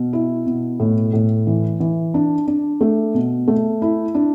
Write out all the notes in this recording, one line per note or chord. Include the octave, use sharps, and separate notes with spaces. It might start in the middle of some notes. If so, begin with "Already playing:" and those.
Already playing: B2
E4
B2
A2
A2
E3
E3
D4
D4
A3
B2
A3
E4
D4